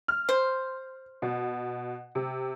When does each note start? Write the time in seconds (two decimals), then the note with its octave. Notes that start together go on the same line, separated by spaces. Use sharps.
0.08 F6
0.29 C5
1.22 B2
2.15 C3